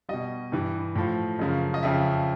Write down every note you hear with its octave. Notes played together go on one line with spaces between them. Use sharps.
B2 G3 D#5
G2 E3 G3
A2 F3
F#2 C#3 F3
D#5
F2 C#3 F3 E5